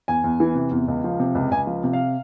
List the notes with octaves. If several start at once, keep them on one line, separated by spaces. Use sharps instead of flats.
E2 G#5
E2
E3
C3
E2
C#2
F3
C3
C#2
C#2 G#5
F3
C3
F5